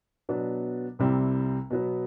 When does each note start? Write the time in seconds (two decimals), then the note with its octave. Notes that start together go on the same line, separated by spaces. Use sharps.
0.29 B2 F#3 B3 D4
0.99 C2 C3 G3 C4 E4
1.70 B2 F#3 B3